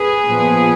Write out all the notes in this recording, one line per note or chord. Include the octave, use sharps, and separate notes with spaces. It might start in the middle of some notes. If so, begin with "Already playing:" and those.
Already playing: G#4 B4
A#2 F3 B3